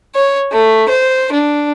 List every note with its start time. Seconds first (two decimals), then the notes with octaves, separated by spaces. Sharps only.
0.15 C#5
0.52 A3
0.89 C5
1.32 D4